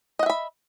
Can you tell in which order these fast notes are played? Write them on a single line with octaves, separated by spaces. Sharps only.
D#5 F#5 E5 B5